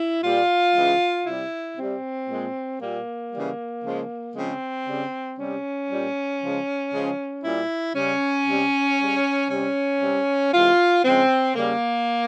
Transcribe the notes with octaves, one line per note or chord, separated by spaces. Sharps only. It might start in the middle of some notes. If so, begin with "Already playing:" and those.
Already playing: E4
A#2 G3 F4
C#3 E3 G#3
C3 G3 E4
C3 G3 C4
A#2 G#3
A#2 G3 A#3
C#3 E3 G3
C#3 F3 G#3
C#3 F3 G#3 C4
C#3 G3
C3 G3 C#4
A#2 G3
C#3 F3 G#3
C#3 F3 G#3
A#2 G3 E4
C#3 G3 C#4
C3 G3
C#3 G3
C3 G3 C#4
C3 G3
C3 E3 G#3 F4
C#3 F3 G#3 C4
C#3 G3 A#3